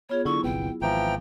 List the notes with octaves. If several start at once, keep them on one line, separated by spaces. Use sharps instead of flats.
B3 F4 G#4 C#5
D3 F#3 E4 C#6
G1 C2 B3 G5
G#1 E3 F3 G5 A#5